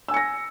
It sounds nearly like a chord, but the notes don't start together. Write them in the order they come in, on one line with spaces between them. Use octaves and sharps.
E6 G#5 C#7 A#6